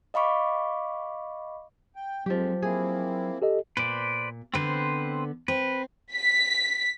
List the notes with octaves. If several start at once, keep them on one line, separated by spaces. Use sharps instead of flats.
D#5 F5 B5 C#6 D6
G5
F2 F3 F#3 G#3 G4
A#3 C4 E4 G#4
G4 A4 D#5
A#2 B4 C5 D5
D3 B3 C4 B4 C5
C4 B4
B6